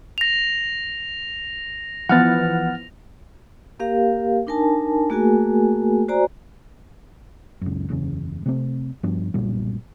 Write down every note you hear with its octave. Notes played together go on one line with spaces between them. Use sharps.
A#6 F7
E3 F3 B3 F#5 F6 A6
A#3 G4 A#4 F5
D4 D#4 A#4 G#5 A5
A3 A#3 F#4 G#4 A#4 G#5
F#4 C5 D5 G#5 A#5
C#2 F#2
F#1 E2 C#3
C3 A3 C4
G2 F3 B3 D4
F#1 B1 A#2 G3